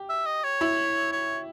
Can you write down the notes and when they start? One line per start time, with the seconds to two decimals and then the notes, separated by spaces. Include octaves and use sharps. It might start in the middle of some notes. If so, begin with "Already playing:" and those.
Already playing: G4
0.09 E5
0.26 D#5
0.44 C#5
0.61 E4
1.12 C#5